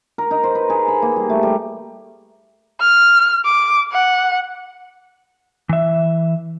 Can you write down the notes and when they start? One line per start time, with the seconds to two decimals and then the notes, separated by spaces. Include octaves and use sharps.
0.18 A#4
0.31 D#4
0.44 C5
0.55 B4
0.70 G#4
0.88 B5
1.02 A#3
1.16 G3
1.30 A3
1.43 G3
2.81 F6
3.45 D6
3.92 F#5
5.69 E3 E5